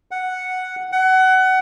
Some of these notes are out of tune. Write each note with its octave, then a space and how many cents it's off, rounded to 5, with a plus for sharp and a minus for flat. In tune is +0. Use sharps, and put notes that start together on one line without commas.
F#5 +0
F#5 +25